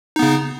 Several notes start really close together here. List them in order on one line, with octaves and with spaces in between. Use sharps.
D#4 B3 C#3